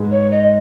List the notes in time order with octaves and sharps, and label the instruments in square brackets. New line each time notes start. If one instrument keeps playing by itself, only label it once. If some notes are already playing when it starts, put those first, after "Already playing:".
Already playing: [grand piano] G#2 G#3 D#4 G#4 B4
[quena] C#5
D#5